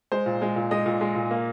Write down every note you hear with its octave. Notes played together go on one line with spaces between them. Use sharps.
G#3 C5
A#2
G#3
A#2
G#3 D#5
A#2
G#3
A#2
A#3